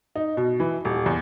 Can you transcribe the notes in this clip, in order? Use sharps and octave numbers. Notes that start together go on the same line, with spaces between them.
D#4
B2
E3
D#1
E2